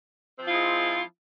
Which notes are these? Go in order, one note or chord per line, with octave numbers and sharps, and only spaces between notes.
F3 G#3 C4 E4 F4